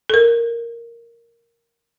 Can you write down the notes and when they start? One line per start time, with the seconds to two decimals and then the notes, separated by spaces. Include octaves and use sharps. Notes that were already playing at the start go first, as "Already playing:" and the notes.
0.10 A4 A#4